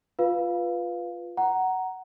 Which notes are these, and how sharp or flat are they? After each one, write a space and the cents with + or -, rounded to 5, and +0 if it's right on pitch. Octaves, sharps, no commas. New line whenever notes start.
F4 +0 B4 +0 F5 +0
F#5 +15 A#5 +0